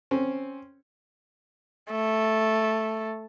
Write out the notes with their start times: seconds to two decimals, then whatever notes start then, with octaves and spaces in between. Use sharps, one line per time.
0.11 C4 C#4
1.91 A3